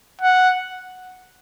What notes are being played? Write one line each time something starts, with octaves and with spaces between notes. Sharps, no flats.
F#5